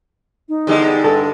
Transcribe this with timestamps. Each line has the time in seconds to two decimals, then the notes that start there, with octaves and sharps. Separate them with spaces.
0.49 D#4
0.67 E2 D3 G3 G#3
1.04 G2 A4